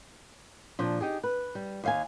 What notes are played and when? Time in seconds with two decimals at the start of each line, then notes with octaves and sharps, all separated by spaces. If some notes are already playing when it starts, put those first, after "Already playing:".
0.79 A#2 F3 D4
1.01 D#4 G4 G#4
1.24 B4
1.55 G3
1.84 D#2 F5 G#5